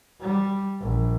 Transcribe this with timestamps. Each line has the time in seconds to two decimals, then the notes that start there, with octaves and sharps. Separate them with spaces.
0.20 G3
0.81 A#1